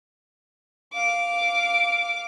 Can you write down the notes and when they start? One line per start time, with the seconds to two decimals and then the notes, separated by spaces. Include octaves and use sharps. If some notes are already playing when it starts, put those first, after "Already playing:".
0.93 F5 D6